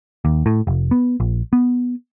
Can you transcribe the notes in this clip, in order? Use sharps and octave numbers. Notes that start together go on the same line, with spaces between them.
D#2
A2
F1
B3
A#1
B3